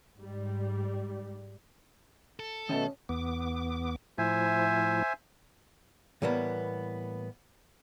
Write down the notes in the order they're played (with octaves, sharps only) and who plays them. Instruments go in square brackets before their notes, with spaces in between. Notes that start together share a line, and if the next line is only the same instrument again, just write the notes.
[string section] G#2 G3
[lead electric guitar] A4
[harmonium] B2 A3 [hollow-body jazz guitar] D#3 G#5 A5 [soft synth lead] C#4
[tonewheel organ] E2 B3 D6
[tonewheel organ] A2 F3 E4 [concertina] C5 E5 G#5
[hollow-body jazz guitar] A2 E3 G3 A#3 B3